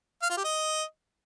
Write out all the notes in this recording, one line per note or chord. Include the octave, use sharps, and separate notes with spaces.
F5
F4
G4
D#5